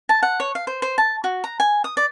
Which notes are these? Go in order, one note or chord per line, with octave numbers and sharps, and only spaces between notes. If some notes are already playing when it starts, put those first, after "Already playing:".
A5
F#5
C#5
F5
C5
C5
A5
F#4
A#5
G#5
D#6
D5